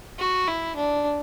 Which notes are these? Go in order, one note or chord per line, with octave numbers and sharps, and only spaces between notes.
F#4
E4
D4